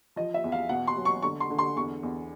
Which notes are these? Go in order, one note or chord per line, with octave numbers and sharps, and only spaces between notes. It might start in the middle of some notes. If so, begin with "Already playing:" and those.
F3 D#5
E5
E2
F5
B2 F#5
C6
F#3
C#6
D3 C#6
C6
D3
C6
E2 C#6
E2